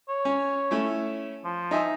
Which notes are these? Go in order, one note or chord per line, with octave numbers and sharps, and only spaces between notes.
C#5
C#4
A3 C#4 E4
F3
D#4 E5 G#5